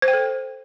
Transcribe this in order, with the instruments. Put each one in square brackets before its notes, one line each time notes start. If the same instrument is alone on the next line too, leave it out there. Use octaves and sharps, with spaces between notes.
[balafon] C5
G5
A4